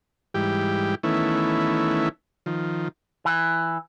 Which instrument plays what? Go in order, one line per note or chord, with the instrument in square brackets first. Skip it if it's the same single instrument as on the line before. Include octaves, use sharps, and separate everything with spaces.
[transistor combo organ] G#2 E3 G3 G4
D#3 E3 A3 B3 C#4 E4
D#3 F3
[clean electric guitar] E3